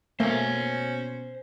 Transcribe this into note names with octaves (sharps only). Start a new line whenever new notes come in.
B2 A3 A#3 C#4 C5 G#5